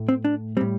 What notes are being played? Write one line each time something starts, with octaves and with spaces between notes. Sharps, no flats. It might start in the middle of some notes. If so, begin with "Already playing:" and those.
Already playing: A2 A3
C4
D4
A2 G3 C4